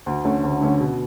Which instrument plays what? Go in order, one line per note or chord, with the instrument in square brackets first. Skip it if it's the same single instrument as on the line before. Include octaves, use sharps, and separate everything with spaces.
[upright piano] D2
D3 A3 C#4
D2
D3 A3 C#4
B2